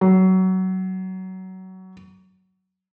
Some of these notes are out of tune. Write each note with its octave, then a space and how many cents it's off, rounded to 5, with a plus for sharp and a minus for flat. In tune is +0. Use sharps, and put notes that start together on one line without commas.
F#3 +20